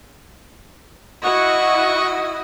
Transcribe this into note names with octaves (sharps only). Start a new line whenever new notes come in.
E4 F#4 D#5 F#5 C#6